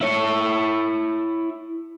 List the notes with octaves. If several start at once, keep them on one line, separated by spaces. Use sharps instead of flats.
E4 C#5